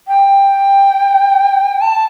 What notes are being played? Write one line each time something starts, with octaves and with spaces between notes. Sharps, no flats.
G5
A5